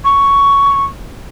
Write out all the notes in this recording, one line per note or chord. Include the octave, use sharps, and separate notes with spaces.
C#6